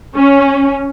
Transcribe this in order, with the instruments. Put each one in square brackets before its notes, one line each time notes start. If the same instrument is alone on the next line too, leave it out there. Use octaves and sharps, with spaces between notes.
[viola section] C#4